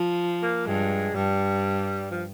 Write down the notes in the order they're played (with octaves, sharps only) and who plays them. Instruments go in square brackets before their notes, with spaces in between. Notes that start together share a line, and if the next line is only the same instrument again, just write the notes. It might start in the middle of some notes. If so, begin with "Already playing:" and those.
Already playing: [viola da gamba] F3
[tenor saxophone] A#3
[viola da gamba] G2 [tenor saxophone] G#3
[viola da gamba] G2 [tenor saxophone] G3
[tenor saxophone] F3